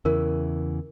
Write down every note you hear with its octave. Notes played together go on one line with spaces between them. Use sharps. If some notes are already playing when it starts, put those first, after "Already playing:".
E2 C#3 E3 A#4